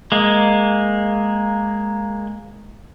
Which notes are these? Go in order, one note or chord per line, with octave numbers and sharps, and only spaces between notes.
G#3 A#3